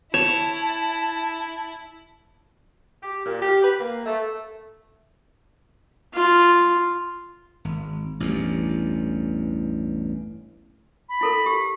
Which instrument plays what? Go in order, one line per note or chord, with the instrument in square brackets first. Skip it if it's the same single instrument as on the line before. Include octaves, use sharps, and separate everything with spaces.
[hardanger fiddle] E4 [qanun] C#5 [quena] A5 [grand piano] E7
[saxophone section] G4
A#2
G4
B4
A#3
A3
[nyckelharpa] F4
[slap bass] G#1
A1 E2 G2
[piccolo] B5
[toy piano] E4 A4 A#4
G4